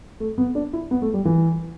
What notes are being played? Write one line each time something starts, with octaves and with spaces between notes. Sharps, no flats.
A3
B3
D4
E4
B3
A3
G3
E3